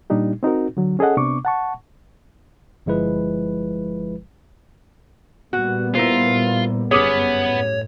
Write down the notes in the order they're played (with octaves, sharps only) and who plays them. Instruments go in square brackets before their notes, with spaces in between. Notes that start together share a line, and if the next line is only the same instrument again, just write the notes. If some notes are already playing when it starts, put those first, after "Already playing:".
[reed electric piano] A#2 G3 D4 D#4 G4
C4 D#4 F#4 A#4
D3 F#3
C#4 G#4 A4 D#5 F#5
C3 B3 D4 C#6 D6
F#5 A5 C#6
[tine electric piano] G1 F3 G#3 E4 B4
[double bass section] A#2 G3 B3 [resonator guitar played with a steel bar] F#4
[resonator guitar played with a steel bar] E4 A#4 C5 [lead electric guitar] F4
[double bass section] G1 F#2 [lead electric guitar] B3 B4 [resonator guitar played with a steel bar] C#4 G4 G#4 [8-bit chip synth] C#5
[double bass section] A2